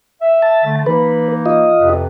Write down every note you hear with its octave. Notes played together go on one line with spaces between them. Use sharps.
E5
A5
D3 A3
E3 A#3 D#4 B4
F4 D#5
F2 C3 B4